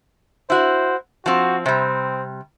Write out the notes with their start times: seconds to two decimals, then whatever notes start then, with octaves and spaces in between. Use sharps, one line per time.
0.50 E4 F#4 C5
1.26 F3 C4 F#4
1.66 C3 G3 C4